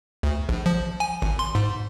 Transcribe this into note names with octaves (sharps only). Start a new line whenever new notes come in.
D2
A#1
F3
G#5
G#1
C6
G#2